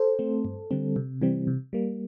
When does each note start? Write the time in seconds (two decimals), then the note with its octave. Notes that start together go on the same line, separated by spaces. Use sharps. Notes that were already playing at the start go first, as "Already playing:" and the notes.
Already playing: A4 C5
0.19 A3 C4
0.45 G2
0.71 D3 G3 C4
0.96 C3
1.22 E3 G3 C4
1.47 C3
1.73 G3 A#3